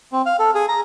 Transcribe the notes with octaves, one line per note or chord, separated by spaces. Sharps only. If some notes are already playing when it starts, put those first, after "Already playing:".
C4
F5
A4
G#4
A#5